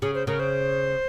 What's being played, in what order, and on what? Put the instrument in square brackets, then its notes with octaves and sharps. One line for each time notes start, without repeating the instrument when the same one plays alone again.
[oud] C#3 [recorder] G#4
[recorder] C5
[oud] C#3 [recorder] A#4
[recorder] C5